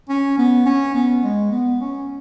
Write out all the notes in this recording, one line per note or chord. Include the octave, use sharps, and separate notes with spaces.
C#4
B3
C#4
B3
G#3
B3
C#4